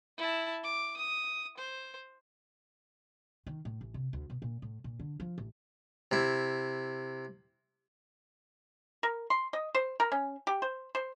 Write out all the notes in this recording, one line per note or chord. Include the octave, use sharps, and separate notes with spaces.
E4 A5
D6
D#6
C5
D#3
A2
A1
C3
D2
B2
A#2
A2
A#2
D3
F3
A1
C3 E4
A#4
C6
D#5
C5
A#4
C#4
G4
C5
C5